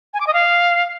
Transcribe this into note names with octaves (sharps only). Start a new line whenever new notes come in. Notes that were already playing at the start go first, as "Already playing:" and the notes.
G#5
D6
D#5
F5